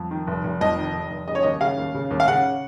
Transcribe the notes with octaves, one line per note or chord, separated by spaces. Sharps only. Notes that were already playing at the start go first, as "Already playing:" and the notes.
Already playing: F2
D#3
F1
F1
F2 D#5
D#3
F1
F1
C#3 D#5
C#5
D#2 D#5
C#3 F5
D#2
C#3
D#2
F5
C#3 F#5